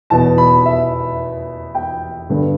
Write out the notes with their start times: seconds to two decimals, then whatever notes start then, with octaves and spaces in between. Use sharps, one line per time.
0.10 E2 B2 B3 A5
0.38 B5
0.66 E5
1.75 G5
2.29 G2 D3 B3